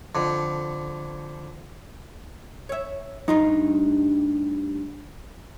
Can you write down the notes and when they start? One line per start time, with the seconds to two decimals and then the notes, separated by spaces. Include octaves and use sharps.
0.15 F2 D3
2.69 C#5 E5
3.28 D2 G2 D#4 F4